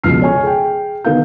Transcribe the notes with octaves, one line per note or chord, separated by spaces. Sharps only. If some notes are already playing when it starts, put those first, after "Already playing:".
C#2 B2 F3 F6 C7
C#5 G#5 C#6
G#4 G5
D#3 B3 F5 G6